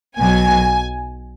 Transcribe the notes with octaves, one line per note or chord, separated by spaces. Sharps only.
B1 B2 F#3 G#5